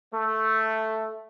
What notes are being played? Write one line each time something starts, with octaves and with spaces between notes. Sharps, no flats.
A3